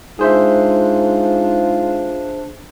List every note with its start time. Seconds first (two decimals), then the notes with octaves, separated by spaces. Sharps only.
0.19 G#2 D4 F4 G#4 C5 E5